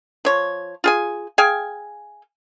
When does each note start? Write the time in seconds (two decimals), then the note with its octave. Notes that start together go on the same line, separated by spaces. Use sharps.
0.25 F3 C#5
0.84 F4 G#4 G#5
1.38 G#4 F5 G5 G#5